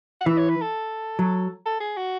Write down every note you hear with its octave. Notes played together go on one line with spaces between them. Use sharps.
F#5
E3 E5
C#5
B4
A4
F#3
A4
G#4
F#4